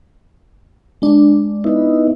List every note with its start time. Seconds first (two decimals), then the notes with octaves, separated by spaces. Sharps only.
1.02 G#3 D4
1.64 B3 D#4 E4